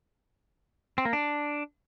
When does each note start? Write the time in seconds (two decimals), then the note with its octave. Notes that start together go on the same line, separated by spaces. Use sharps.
0.98 C4
1.05 A#3
1.13 D4